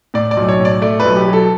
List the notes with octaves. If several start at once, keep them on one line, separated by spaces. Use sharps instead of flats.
A2 D5
D5
B1
C#5
A2
D5
A3 D5
B4
B1
G4
F#3 A4